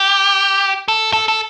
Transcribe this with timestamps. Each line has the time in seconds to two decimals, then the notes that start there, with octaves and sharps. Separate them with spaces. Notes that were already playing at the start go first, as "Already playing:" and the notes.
Already playing: G4
0.88 A4
1.13 A4
1.28 A4